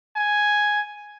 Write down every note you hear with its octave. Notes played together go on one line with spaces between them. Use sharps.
G#5